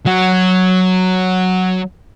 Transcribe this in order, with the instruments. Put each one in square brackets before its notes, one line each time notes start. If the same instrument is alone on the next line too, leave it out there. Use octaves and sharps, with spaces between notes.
[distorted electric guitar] F#3 F#4